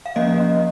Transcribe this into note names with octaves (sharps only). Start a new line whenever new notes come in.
F5
F3 A#3 C#4 D#5